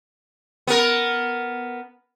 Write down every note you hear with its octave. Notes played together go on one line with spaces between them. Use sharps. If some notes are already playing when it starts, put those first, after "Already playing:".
B3 A#4